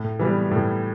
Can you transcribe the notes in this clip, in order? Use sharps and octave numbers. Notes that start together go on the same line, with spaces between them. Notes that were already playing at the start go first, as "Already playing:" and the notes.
Already playing: A2
E3 G3 B3
A2